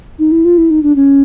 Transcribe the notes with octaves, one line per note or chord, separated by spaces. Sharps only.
D#4
E4
F4
E4
D#4
D4
C#4